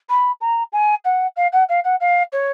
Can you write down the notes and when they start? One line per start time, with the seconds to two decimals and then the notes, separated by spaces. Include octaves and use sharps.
0.09 B5
0.40 A#5
0.72 G#5
1.04 F#5
1.36 F5
1.52 F#5
1.68 F5
1.84 F#5
2.00 F5
2.32 C#5